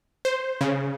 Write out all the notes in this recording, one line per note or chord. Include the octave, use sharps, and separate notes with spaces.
C5
C#3